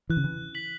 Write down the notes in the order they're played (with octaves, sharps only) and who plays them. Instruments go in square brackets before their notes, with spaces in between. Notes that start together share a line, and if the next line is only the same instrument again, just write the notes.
[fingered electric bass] E3 [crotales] F#6
[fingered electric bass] C#3
E3
[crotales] B6 F#7